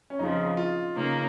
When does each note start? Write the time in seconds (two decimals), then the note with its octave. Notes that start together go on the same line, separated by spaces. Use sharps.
0.10 C#4
0.19 F2 C#3 F3 D#4
0.57 F4
0.94 C#3 A#3 D#4